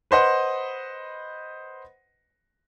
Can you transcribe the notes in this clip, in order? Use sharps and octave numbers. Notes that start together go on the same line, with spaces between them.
B4 C5 D#5 F#5